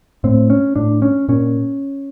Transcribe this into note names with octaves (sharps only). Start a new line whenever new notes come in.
A2 C4
C#4
A2 D4
C#4
A#2 C#4